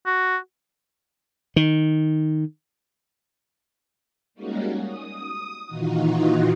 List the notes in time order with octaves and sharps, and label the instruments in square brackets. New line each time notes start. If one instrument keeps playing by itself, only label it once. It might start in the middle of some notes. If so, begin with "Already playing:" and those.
[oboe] F#4
[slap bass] D#3
[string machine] G3 G#3 A#3 C#4 D#4 F#4
D#6
A#2 D#3 E3 D#4 F4 F#4